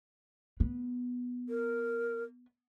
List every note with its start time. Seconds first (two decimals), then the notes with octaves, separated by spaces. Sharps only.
0.60 B3
1.49 A#4